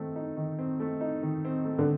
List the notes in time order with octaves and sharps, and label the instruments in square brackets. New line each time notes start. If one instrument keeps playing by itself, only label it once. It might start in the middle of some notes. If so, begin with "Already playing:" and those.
Already playing: [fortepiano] D#3 A3 C4
D#4
D#3
C4
A3
D#4
D#3
C4
A3
[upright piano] D3